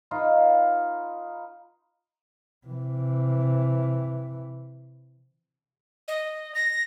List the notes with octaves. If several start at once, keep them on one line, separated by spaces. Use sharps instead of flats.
D#4 F4 B4
C3 E3
D#5
A#6